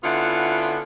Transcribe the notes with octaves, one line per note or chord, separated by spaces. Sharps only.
D3 B3 C#4 E4 F4